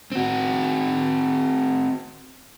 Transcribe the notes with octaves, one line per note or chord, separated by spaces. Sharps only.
C4 F#4